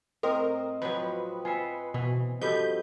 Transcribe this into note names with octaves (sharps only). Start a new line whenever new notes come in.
A2 C4 A#4 D#5
F3 F#3 B4
F4 E5 G#5 C7 C#7
B2 E3
G2 F3 F#4 A4 B4 D#5 G6